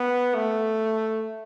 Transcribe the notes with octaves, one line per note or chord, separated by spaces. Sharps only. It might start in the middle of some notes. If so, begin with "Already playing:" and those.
Already playing: B3
A3